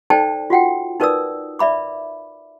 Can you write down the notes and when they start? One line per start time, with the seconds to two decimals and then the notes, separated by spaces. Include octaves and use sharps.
0.10 D#4 A4 C5 D5 G5 A5
0.50 F4 F#4 F#5 G5
1.00 D#4 A#4 B4 D5 D#6 E6
1.59 D5 E5 B5 D6